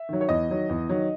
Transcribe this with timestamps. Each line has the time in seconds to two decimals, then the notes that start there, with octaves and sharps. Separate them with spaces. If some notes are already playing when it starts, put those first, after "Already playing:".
Already playing: E5
0.09 D#3 F#3
0.21 C#5
0.29 E2 D#5
0.49 D#3 F#3
0.69 E2
0.89 D#3 F#3